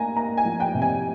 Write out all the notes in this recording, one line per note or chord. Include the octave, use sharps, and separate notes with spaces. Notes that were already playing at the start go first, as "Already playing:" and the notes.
Already playing: A#3 D4 G#5 A#5
A#3 A#5
G#5
F3
G5
C3
G#5